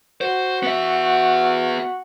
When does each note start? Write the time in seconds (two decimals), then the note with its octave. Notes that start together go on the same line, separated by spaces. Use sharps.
0.21 F#4 C5
0.63 B3 E5